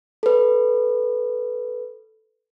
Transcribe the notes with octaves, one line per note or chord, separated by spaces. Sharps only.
A4 B4